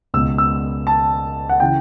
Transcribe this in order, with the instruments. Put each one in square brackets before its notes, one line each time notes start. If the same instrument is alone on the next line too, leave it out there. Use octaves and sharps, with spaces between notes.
[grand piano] C#2 B2 E6
E6
A5
F#5
C#3 E3 G5